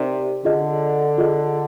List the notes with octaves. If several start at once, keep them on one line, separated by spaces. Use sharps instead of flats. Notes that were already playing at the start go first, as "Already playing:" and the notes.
Already playing: C3 D#4 G4 A#4 D5
D3 F4 G#4 D#5
F4 G#4 D#5